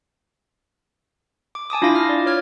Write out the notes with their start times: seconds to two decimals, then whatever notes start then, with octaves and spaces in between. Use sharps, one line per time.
1.55 D6
1.70 G#5 A5 D6 D#6
1.82 D4 E4 F4 F5 D6 A#6
1.95 F6
2.09 D5
2.26 C#5 F6 G#6